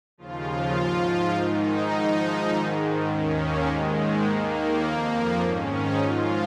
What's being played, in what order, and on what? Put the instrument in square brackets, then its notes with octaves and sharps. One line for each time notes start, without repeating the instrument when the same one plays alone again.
[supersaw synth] D#2 C#3 F3 F4
G#2 F3
G#2 D#3 D#4
G#2 F3
G#2 D#3
D#2 D#3 C#4
A#3
G#2 D#3 G#3
D#2 D#3 A#3
F2 F3
G#2 D#3 C#4
D#4
G#2 F3 F4